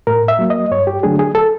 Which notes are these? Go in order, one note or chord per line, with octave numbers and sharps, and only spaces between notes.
A2 A#4
E5
F#3 A#3
D#5
G2 C#5
G4
D3 F#3 A3 D4 G#4
G#4
A4